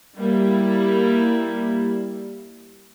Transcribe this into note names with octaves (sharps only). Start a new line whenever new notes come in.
G3 A#3 E4